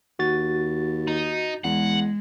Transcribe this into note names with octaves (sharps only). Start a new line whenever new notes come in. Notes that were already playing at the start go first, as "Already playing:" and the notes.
D#2 F#4 A6
D#4
E2 G#3 F#5